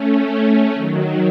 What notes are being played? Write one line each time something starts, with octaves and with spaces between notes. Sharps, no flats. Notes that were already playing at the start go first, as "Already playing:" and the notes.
Already playing: A3 C#4
A3 C#4
D#3 F#3